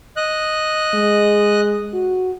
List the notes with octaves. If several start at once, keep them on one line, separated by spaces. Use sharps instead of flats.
D#5 F#6
G#3
F#4